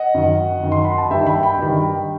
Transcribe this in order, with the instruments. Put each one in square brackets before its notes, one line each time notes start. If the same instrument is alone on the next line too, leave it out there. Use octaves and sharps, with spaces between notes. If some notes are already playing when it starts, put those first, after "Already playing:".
Already playing: [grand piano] D#5 F#5
F#2 D#3
F#2 D#3
C6
B5
A5
G2 D#3 E5 G5
G5 B5
G5 B5
G2 D#3